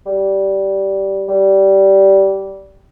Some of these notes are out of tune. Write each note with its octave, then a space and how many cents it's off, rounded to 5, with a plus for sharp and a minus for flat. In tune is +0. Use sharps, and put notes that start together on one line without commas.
G3 -10
G3 -15